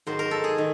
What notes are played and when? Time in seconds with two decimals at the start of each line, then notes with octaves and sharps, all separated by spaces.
0.07 G#2 D#3 F#3 C5
0.19 A#4
0.31 A4
0.44 G#4
0.58 D#3